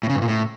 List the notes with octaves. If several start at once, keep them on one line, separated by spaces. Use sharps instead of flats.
A2
C#3
G2
A#2
A2